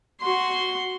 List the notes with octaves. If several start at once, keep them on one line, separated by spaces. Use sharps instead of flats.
F#4 C6